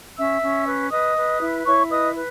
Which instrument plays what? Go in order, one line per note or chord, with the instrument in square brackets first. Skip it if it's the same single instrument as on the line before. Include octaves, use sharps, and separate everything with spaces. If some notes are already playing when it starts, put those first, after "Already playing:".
[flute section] C#4 E5 E6
C#4
B4
B4 D#5 D#6
B4
E4
E4 C#5 C#6
B4 D#5 D#6
B4